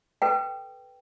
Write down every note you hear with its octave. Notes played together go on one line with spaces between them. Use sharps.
A4 B4 G5